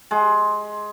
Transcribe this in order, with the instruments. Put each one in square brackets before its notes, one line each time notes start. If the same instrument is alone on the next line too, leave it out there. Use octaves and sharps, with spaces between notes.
[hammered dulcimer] G#3